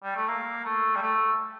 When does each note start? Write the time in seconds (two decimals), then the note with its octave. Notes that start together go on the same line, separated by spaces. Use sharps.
0.04 G3
0.16 A3
0.28 A#3
0.65 A3
0.96 G3
1.02 A3